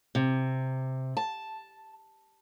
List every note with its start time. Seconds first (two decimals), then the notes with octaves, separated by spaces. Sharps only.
0.15 C3
1.17 A5